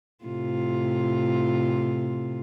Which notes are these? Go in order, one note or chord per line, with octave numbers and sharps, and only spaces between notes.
A2 C3 F4